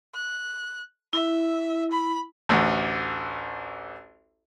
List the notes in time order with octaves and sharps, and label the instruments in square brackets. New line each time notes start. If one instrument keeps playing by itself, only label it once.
[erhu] F#6
[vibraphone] E4 [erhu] E5
[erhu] B5
[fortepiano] A1 D2